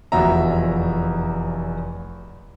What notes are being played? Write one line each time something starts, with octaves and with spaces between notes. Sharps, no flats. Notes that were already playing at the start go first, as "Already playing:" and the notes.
F1 E2 F3 F#4 E5 A#5